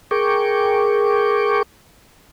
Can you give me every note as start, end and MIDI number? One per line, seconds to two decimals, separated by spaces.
0.11 1.63 68
0.11 1.63 70
0.11 1.63 79
0.11 1.63 85
0.11 1.63 86